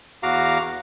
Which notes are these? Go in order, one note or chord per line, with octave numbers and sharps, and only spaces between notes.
E2 F#4 F5 A#5 D6